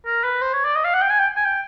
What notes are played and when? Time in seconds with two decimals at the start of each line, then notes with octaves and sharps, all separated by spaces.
0.06 A#4
0.24 B4
0.42 C5
0.53 C#5
0.65 D5
0.76 D#5
0.84 F5
0.93 F#5
1.02 G5
1.10 G#5
1.19 G5
1.36 G#5
1.45 G5